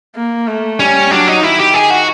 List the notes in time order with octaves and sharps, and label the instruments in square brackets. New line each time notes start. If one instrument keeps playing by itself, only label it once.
[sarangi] A#3
A3
[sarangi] G3 [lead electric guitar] C#4
[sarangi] F#3 [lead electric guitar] D4
[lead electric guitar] D#4
[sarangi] D#3 [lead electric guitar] E4
[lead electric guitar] G4
G#4
F#4